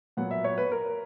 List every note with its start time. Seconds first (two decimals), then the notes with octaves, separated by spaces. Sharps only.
0.17 A#2 F#3 B3 F#5
0.31 E5
0.44 C#5
0.58 B4
0.72 A#4